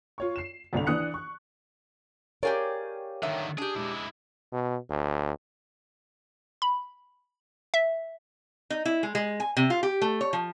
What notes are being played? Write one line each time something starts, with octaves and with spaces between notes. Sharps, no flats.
F4 C#5 C#6
C7 E7
G1 C2 D3 F7
E3 D4 D#6 F#6 C#7
C#6
G4 G#4 A#4 C#5 D5 F5 G5
D3 D#3 E5
D4 G4 G#4
G#3 E4
B2
D2
B5
E5
D#4
E4
G#3
G#3
G#5
C3
F4
G4
A3
C#5
F3